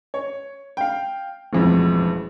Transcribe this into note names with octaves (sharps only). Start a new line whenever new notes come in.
C#5
F5 G5
E1 A1 F2